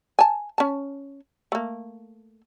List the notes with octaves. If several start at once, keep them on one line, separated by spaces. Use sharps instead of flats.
G#5 A5
C#4 A5
A3 A#3